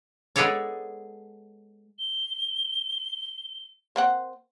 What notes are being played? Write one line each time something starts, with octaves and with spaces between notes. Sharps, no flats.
G#3 B3 G#4 A4 C#5 D5
G7
A#3 C4 F#5